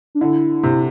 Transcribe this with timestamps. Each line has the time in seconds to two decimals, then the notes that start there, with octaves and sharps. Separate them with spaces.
0.15 D4
0.21 D3 E4
0.63 C3